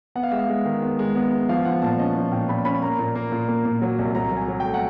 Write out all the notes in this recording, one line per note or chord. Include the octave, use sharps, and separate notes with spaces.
B3 F#5
F5
G#3 E5
F5
G#3
D#3
B3
G#3
B3
B3
F3 F5
F3 F#5
A#2 A5
C#4 D#5
F3
A#2 G5
A#2 B5
C#4 B5
A#3 A#5
A#2
A#3
A#2
A#3
A#2
F#3
C2
F#3 A#5
F#3
G#5
F#3
G5
A3
F#5